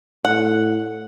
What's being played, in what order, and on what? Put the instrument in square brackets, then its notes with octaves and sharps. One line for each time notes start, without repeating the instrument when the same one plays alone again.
[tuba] A2 [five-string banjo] F#5